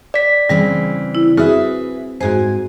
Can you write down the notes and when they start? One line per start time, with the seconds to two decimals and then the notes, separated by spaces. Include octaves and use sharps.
0.14 D5 B6
0.49 C#3 E3 G3 C4
1.15 E4
1.37 C4 F#4 G#4 B4 E5
2.21 G#2 F#4 G#4 C5 G#5